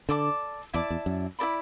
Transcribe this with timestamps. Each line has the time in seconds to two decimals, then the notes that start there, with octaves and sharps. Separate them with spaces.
0.09 D3 A4 D5 A5 D6
0.74 E2 E4 D5 A5
0.90 E2
1.06 F#2
1.39 E4 A4 D5 B5